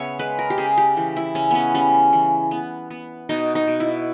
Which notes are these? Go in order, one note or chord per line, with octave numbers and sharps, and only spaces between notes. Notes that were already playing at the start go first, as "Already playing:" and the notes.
Already playing: C#3 B3 C#5 E5
G#3 B4
A#4
G4
C#3 G#4
G4
E3
E4
C#3 C#4
B3 C#4
G3 C#4
E3
B3
B3
B2 D#4
D#4
B2
E4